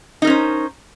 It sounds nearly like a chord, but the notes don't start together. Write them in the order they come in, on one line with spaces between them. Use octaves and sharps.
D#4 A#4 C#4 C5